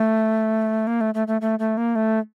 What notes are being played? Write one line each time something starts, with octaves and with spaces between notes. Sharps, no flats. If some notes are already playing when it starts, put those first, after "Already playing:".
Already playing: A3
A#3
A3
A3
A3
A3
A3
A#3
A3